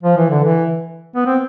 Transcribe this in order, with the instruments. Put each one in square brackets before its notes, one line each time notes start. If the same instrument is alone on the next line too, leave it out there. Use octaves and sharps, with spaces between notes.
[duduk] F3
E3
D3
E3
B3
C4